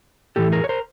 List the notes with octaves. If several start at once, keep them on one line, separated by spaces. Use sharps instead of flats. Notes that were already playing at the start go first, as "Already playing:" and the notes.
A2 E3 A3 G4 A4
G#4 A#4
C#5
A#4 C5